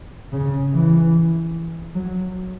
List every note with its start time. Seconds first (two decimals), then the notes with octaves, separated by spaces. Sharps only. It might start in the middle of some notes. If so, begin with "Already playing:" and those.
0.32 C#3
0.73 E3
1.95 F#3